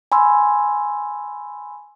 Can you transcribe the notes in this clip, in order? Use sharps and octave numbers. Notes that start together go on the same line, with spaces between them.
G#5 B5 C6 E6